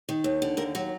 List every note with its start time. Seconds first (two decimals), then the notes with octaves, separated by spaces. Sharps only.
0.09 D#3
0.24 D#2
0.42 D3
0.57 D#2 A#4
0.75 F#3 F#4